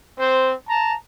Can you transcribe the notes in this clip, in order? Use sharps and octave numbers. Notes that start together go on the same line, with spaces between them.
C4 C5
A5 A#5